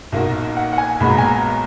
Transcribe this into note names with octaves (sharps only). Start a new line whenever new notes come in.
B1 A#2 A#3 D#4 F#4
F#5
F#5
G#5
B1 A#2 G#3 B3 F#4 B5
A#5
G#5
A#5